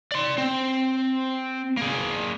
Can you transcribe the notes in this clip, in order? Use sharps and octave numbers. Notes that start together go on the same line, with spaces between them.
D5 C6
C4
A#3 G#4